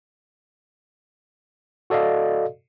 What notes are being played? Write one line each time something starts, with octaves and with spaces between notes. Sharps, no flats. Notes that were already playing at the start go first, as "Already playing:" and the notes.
F#4 A4 D5 D#5 F5